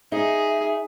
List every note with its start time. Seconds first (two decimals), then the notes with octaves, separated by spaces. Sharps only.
0.12 D#4 G#4 E5